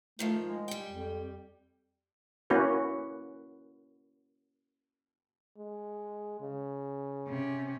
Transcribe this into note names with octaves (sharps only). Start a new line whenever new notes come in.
G#2 D#3 F3 A3
G#3
G3 G5
F2
A#3 C#4 E4 F#4 B4
G#3
C#3
C3 C#4